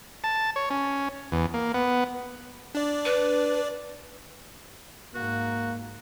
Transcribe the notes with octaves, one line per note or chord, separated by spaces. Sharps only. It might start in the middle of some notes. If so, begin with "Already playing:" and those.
A5
C#5
C#4
E2
A#3
B3
D4 D5
B4
G#2 A#3 F#4